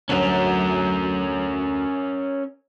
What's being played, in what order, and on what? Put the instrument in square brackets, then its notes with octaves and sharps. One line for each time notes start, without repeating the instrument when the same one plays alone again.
[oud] D2 F#3 [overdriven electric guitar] C#4 A#4